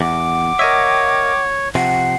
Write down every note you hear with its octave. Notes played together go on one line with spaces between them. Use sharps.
E2 F#5 D6
A#4 C#5 D#5 E5
C3 F3 F#5 C7